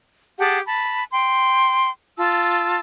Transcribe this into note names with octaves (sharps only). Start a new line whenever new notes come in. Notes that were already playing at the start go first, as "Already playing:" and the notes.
G4 G#4 F#5 A5
A5 B5
G5 C6
F4 A5 E6